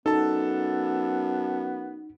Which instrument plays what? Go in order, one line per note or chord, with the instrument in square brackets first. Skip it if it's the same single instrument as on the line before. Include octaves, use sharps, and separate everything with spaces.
[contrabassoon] F#2 [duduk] B3 [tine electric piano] D#4 [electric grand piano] A4 A5